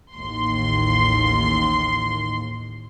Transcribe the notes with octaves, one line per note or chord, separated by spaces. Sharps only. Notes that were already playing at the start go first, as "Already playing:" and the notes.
A1 D#2 C6